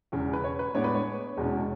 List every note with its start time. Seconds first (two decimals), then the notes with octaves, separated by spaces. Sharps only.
0.12 E1 E2 C#3
0.33 B4
0.44 C#5
0.59 B4
0.74 A2 G#3 B3 D4 C#5
0.84 B4
0.95 C#5
1.37 E1 E2 B2 G#3 C#4